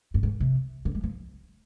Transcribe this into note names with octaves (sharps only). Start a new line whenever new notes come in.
G2
G#2
C3
D3
G3
F3